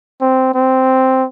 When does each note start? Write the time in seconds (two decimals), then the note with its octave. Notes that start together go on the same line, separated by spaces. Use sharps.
0.21 C4
0.55 C4